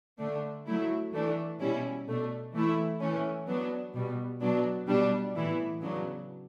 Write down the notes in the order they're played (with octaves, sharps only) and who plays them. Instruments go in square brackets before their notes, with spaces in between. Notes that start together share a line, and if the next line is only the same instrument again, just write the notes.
[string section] D3 A3 D4
F#3 A3 E4
E3 A3 D4
B2 G3 C#4 E4
B2 A3 D4
E3 A3 E4
E3 A3 C#4
F#3 B3 D4
B2 G3 B3
B2 F#3 B3 D4
B2 G3 D4
A2 E3 B3 E4
C#3 F#3 B3 D4